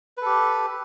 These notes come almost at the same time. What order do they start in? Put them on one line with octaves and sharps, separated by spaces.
B4 A4 G4